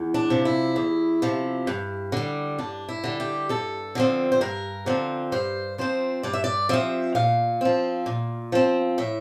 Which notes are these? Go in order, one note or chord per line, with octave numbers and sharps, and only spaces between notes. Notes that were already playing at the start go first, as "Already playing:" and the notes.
Already playing: E2
D4
C3 F3
E4
E2
C3 F3
G2
D3 G3
G2 D4
E4
D3 G3
G4
G2 A4
D3 F3 C4
C5
G2 A#4
D3 F3 C4
G2 C5
F3 C4 C5
G2 D5
E5
D5
F3 C4 E5
A#2 F5
F3 C4
A#2
F3 C4
A2 E5